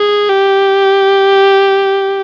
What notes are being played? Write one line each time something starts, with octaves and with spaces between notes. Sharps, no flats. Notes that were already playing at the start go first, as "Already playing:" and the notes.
Already playing: G#4
G4